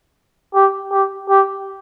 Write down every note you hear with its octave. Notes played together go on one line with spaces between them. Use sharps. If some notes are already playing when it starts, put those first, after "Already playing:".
G4
G4
G4